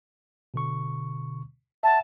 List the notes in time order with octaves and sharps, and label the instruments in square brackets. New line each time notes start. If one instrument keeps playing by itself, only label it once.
[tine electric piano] B2 D3 C#6
[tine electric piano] E5 F#5 [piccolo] A5